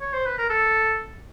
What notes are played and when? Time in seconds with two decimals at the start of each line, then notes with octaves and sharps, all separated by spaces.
0.01 C#5
0.13 C5
0.26 B4
0.38 A#4
0.50 A4